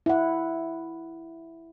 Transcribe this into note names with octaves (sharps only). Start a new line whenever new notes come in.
E4 F#5